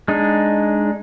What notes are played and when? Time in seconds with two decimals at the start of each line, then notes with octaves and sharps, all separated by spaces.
0.08 G#3 D4 D#4